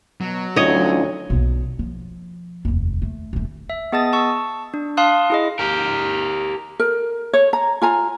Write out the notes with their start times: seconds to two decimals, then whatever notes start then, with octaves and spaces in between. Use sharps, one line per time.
0.21 B2 F#3
0.56 D2 C#4 D#4 F4 C#5 D#5
1.30 B1 E2
1.79 F3
2.65 F1 D#2
3.02 A3
3.33 D#1 A3
3.70 E5
3.92 B3 G#4 D#5 A5 D#6 A6
4.13 A5 C#6 E6
4.74 D4
4.97 F5 A5 C6 D#6 F#6
5.30 E4 G#4 D#5
5.59 G4 A#4
6.80 A#4
7.33 C#5
7.53 A#5
7.82 F4 G#5 A#5